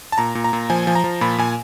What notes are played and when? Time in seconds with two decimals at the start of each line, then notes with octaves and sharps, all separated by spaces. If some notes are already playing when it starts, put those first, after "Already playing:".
0.12 A5
0.18 A#2 A#5
0.35 A#2
0.44 A#5
0.53 A#2
0.70 F3 G#5
0.87 F3
0.95 A#5
1.04 F3
1.21 A#2 B5
1.38 A#2 G#5